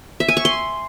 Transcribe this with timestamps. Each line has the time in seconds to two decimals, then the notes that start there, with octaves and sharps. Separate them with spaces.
0.20 E5
0.28 G#5
0.37 C#6
0.45 C6